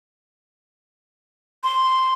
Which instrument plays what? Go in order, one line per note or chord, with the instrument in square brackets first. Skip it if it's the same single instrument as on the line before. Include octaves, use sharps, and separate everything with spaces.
[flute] C6